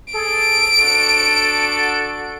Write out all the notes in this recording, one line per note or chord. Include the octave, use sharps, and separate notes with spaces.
G#4 A4 D7
D4 F#4 A4